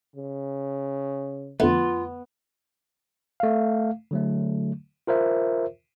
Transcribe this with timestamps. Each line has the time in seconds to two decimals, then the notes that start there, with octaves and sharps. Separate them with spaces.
0.16 C#3
1.60 F2 D3 A3 B3 F4
3.40 A3 F5
4.11 D3 F#3 A3
5.07 F4 A#4 C5 E5